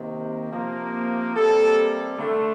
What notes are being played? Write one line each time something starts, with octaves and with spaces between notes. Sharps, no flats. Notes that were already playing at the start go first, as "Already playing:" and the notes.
Already playing: C3 D#3 A#3
C3 F3 A#3
C3 G3 A#3 A4
D3 A3